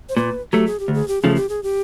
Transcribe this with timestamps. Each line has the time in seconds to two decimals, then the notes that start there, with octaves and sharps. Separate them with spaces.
0.09 C5
0.17 A#2 B4
0.53 F#3 A3 G4
0.66 G#4
0.80 G4
0.88 D2
0.94 G#4
1.08 G4
1.22 C#3 F3 A3 G#4
1.36 G4
1.49 G#4
1.63 G4